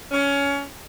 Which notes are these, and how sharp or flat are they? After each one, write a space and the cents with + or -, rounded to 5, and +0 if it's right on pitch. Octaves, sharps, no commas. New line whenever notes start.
C#4 +20